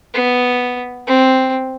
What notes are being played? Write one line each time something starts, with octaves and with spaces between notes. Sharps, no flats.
B3
C4